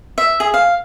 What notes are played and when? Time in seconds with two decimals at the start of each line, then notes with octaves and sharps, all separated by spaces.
0.18 E5
0.40 G#4
0.54 F5